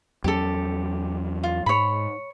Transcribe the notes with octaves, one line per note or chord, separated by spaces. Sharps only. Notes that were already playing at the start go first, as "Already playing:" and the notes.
E2 F#3 C#4 G4 A4
F4
G#2 C#5 B5